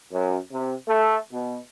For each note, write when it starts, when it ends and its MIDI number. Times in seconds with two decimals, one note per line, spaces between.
0.12 0.37 42
0.51 0.74 48
0.87 1.15 57
1.32 1.57 47